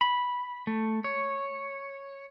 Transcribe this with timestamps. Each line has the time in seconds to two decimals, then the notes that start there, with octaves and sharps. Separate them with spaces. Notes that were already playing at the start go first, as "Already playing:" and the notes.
0.01 B5
0.67 A3
1.04 C#5